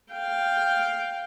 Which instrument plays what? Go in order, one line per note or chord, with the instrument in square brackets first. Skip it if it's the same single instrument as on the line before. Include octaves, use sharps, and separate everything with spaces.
[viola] F5 G5